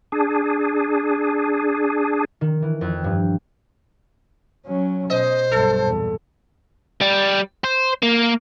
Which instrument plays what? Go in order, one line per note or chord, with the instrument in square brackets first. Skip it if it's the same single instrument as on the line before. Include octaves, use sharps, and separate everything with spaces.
[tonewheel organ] D4 G#4
[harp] D#3
E3
F2
G2
[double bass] F#3 C#4
[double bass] B2 [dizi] C5 [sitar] D#5
[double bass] B1 G2 [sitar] A4
[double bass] E2 A#2
[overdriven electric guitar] G3
C5
A#3